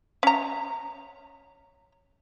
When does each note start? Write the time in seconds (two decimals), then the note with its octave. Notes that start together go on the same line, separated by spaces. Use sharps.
0.23 C#4 A#5